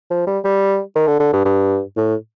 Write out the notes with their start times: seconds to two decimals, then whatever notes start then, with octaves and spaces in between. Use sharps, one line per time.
0.10 F3
0.27 G3
0.44 G3
0.95 D#3
1.08 D3
1.19 D3
1.33 G2
1.45 G2
1.97 A2